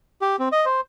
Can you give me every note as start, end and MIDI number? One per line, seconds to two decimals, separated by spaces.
0.22 0.36 67
0.39 0.48 60
0.52 0.65 75
0.66 0.81 72